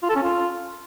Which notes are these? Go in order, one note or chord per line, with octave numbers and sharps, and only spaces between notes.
F4
A4
C#4
F4